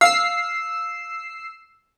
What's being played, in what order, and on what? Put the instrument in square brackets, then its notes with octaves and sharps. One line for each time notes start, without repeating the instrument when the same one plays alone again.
[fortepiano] F5 [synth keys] E6 C7